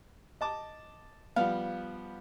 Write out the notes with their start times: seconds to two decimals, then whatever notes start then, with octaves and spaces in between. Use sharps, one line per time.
0.41 D#5 A5 D6
1.36 F3 G3 B3 F5